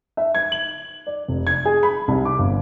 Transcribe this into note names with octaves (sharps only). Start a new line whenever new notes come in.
E5
G#6
F#7
D5
F1
G#6
G#4
B5
C2
D6
G1